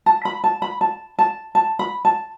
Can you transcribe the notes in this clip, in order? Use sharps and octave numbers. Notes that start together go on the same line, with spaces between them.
A5
B5
A5
B5
A5
A5
A5
B5
A5